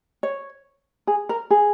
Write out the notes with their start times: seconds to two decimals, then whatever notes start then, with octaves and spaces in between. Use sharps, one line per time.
0.23 C#5
1.07 G#4
1.29 A#4
1.51 G#4